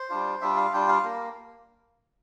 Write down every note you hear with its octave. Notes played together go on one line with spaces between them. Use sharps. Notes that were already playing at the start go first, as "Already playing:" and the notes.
Already playing: C5
G3 D4 F4
G3 D4 F4 E5
F5
G3 D4 F4 G5
F5
A#3